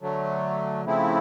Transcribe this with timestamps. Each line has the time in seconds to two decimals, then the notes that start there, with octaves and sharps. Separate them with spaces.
0.02 D3 F#3 A3
0.84 C#3 F3 A3 C4 E4